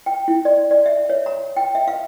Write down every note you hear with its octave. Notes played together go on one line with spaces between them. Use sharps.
G5
E4
D5
D5
E5
C#5
A#5
G5
E5
F5